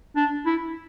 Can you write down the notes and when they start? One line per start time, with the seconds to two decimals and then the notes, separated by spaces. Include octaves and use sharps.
0.16 D4
0.46 E4